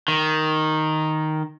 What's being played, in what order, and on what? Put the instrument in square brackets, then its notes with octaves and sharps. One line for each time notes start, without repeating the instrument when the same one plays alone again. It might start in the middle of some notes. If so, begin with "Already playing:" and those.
[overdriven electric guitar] D#3